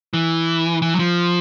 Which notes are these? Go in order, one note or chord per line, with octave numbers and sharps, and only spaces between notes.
E3
E3
F#3
F3